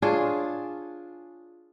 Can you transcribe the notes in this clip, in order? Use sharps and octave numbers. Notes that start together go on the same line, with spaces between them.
D4 F4 G#4 C#5